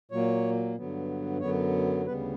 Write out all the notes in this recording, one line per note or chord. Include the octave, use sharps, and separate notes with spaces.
A#2 F#3 A#3 C#5
G2 D3 F#3 B3
F#2 D3 F#3 B3 C#5
D2 C#3 G3 B3 B4